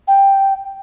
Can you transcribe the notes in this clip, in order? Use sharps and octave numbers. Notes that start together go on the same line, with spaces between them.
G5